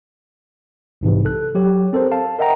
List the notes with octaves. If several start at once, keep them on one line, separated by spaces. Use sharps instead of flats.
B1 G#2 C3 E3
A4 F#6
F#3 G4 C#5
C4 A4 A#4 C5
F5 A5
A#4 D#5 E5 F#5 G5 A#5